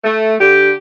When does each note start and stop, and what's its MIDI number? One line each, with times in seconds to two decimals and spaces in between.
0.04 0.35 57
0.40 0.71 50
0.40 0.71 67